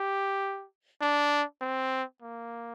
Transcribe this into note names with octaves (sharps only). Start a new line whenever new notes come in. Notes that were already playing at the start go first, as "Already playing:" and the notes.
Already playing: G4
D4
C4
A#3